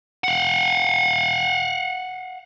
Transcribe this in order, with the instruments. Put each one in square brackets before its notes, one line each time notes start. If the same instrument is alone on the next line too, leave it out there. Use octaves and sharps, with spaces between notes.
[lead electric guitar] F5 F#5